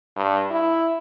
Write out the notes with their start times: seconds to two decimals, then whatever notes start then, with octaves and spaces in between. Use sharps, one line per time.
0.16 G2
0.51 E4